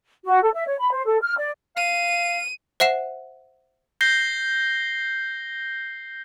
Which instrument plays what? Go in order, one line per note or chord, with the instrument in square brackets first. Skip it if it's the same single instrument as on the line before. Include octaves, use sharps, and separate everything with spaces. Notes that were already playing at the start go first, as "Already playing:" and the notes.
[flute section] F#4
A4
E5
C#5
B5
C5
A4
F6
D5
[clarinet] F5 [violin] D#7
[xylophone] C5 E5 F#5 C7 E7
[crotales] G6 A#6 C7 G7